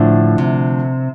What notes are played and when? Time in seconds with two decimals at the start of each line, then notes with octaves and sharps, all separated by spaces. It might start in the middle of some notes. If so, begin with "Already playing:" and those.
Already playing: A2 D3 F3 A3 D4
0.38 C3